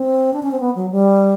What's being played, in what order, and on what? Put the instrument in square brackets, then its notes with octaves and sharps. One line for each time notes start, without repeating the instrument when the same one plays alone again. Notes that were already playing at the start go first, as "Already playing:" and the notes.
Already playing: [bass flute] C4
D4
C#4
C4
B3
F#3
G3